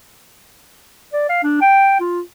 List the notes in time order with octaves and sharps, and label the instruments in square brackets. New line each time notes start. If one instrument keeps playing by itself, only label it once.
[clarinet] D5
F5
D4
G5
F4